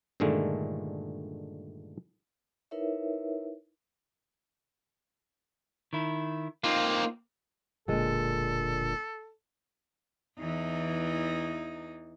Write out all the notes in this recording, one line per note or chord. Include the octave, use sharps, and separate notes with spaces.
G2 A#2 D3 D#3 G#3 A3
D#4 E4 A#4 B4 C#5 E5
D#3 E4
A#3 C4 D#4 F4
E1 A#2 D3 G#3 A4
E2 E3 D#4